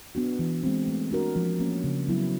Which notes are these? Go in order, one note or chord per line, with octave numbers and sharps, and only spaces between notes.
B3 D4 F#4
E3
G#3 C4
A3
D4 F#4 A#4
F3
A#3 C#4
C#3
F#3 B3 E4